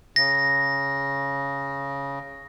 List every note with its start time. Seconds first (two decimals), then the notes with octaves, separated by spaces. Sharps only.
0.16 C#3 A#6